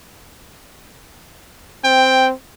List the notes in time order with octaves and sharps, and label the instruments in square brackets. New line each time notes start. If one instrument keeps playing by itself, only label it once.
[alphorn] C4 [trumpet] G5